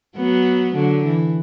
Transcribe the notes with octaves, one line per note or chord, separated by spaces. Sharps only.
F#3 B3
D3 F#3
E3